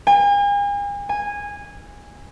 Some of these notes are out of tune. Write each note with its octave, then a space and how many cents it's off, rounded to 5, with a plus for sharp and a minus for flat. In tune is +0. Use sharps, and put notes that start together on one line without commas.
G#5 -40
G#5 -15